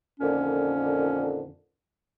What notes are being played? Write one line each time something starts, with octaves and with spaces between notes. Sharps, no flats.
F2 A#2 D3 D#3 C#4